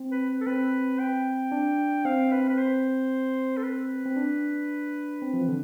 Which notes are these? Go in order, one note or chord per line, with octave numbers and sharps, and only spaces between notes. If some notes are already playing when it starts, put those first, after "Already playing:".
Already playing: C4
B4
A4
C4 B4
G5
D4
C4 F5
B4
B4
C5
A4
B4
C4
D4
C4
F3
E3
D3